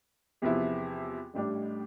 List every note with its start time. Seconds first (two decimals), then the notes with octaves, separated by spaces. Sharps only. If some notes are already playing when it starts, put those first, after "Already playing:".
0.42 E2 C3 F3 B3 E4
1.34 A1 A2 G3 D4